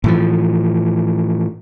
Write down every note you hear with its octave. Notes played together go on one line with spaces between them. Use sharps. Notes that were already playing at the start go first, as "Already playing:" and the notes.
A2 E3 F3